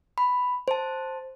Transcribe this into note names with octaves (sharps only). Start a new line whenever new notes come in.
B5
C5 A5